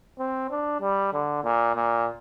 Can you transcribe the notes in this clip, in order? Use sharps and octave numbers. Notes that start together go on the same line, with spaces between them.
C4
D4
G3
D3
A#2
A#2